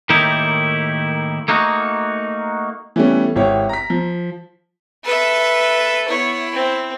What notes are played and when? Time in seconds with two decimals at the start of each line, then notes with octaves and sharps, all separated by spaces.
0.10 A2 D#3 A#3 D#4 E4 G4
1.48 A3 A#3 D#4 F#4
2.96 E3 G3 A3 B3 C#4
3.36 G#1 E4 G4 C#5
3.69 A#5 B6
3.90 F3
5.05 A4 B4 E5
6.08 B3 E4 C#5
6.53 C4